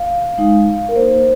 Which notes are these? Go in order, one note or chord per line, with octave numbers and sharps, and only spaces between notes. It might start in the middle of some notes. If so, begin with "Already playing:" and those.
Already playing: F5
G#3 D#4
A#4
A#3 D#4 C5